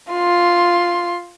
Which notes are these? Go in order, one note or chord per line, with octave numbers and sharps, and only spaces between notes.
F4 C6